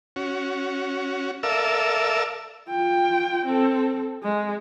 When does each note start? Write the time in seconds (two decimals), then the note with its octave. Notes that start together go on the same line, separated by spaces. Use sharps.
0.16 C#4 F#4
1.43 A4 A#4 D5 E5 F5 E6
2.69 F4 G5
3.46 C4 A4
4.23 G#3